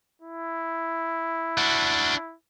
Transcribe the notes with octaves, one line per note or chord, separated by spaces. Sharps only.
E4
D4 F#4